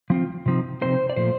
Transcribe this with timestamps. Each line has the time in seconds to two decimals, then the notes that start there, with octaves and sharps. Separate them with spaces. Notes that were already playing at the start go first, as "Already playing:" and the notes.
0.10 F3 C4 F4
0.46 C3 F3 C4 D#4
0.82 C3 F3 C4 D#4 C5
1.10 D5
1.16 A#2 F3 A3 C5